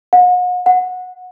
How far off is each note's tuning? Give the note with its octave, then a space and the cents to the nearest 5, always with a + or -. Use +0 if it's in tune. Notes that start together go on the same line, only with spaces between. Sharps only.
F#5 -40
F#5 -20